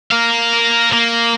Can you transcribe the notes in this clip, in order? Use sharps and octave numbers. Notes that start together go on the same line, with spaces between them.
A#4 F5
A#3